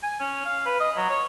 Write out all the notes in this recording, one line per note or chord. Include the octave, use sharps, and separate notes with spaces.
G#5
C#4
F5
B4
D#5
F#3
C#5